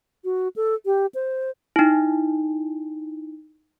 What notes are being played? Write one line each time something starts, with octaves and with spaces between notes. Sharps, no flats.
F#4
A4
G4
C5
D#4 E4